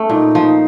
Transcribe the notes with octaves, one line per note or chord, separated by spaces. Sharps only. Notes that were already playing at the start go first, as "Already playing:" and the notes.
Already playing: A3 C#4
A#2 D#4
F3